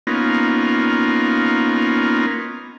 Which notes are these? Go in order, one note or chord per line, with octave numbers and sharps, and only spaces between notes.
A#3 B3 C#4 D#4 F4